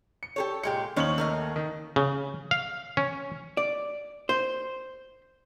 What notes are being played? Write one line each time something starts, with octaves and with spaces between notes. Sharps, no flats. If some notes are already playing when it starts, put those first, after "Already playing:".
C#7
G4 A4 C#5
A#2 G#3 G4 C#7
D#2 C#4 D#4 C5 C#5 F#7
A3 A#4 D#5
D#3
C#3
F5
C#4
D5
C5